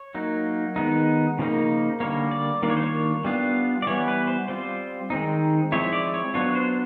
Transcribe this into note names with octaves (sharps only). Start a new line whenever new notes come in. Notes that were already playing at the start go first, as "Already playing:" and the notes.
Already playing: C#5
F#3 A#3 D#4
D#3 G#3 B3 D#4
C#3 F3 A#3 D#4
D3 G3 A#3 C#5
D5
D#3 G3 A#3 D4 F4 D5
C#5
C5
C#5
G3 B3 D4 F4
D5
E3 G3 B3 C#5
B4
C5
G3 C4 F4 C5
D#3 G#3 C4 D#4
F3 G#3 C4 E4 C#5
C#5
D5
C#5
F#3 B3 D4 F4 C#5
C5